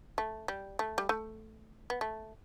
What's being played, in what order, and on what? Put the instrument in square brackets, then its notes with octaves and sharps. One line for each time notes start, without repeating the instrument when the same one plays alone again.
[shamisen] A3
G3
A3
G3
A3
B3
A3